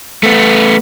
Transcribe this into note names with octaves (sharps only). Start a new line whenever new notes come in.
A3 B3